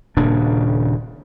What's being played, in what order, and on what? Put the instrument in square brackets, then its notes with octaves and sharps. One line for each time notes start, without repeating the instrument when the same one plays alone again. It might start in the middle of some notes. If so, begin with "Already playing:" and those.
[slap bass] D#1 A#2 C#3 D4